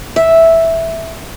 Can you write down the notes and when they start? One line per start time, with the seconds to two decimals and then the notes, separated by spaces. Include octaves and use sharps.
0.16 E5